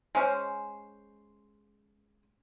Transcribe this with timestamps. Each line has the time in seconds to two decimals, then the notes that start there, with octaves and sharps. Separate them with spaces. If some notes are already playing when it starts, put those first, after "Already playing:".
0.15 G#3 C#4 C5